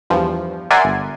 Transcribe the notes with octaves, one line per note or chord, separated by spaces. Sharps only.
E2 G2 F3
A#4 D5 E5 F#5 G#5 C6
G1